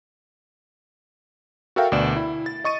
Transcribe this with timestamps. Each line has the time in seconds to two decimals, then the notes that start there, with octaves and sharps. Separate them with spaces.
1.76 F#4 A4 A#4 E5 F5 G5
1.92 D2 B2 D5 E7
2.16 E4
2.46 A6
2.64 D#5 C#6 A6 D#7